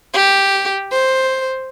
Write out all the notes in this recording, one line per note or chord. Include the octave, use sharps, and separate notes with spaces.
G4
C5